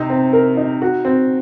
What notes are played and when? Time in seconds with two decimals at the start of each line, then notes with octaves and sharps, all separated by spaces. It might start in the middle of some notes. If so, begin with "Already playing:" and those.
Already playing: C3 D#4
0.10 C4
0.33 A#4
0.57 D#4
0.82 F#4
1.05 C4